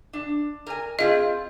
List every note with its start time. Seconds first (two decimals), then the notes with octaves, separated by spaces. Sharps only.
0.13 D4
0.66 A#4 G#5
0.99 C4 F4 G#4 D#5